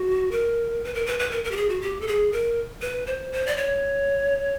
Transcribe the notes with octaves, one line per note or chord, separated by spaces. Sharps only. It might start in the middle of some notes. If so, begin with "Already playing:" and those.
Already playing: F#4
A#4
B4
A#4
B4
B4
A#4
A#4
G4
G#4
F#4
G4
A4
G#4
A#4
B4
C5
C5
D5
C#5